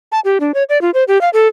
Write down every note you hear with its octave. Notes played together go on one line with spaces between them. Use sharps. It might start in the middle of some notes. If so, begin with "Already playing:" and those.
A5
G4
D4
C#5
D5
F4
C5
G4
F5
A4